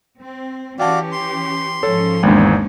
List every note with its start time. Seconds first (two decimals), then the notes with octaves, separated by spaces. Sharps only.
0.20 C4
0.80 E3 C#4 F#4 G4 D5 F5 G5 A5
1.12 C6
1.83 G#2 F3 C#4 A4 C#5
2.23 G#1 E2 G#3 A#3 D4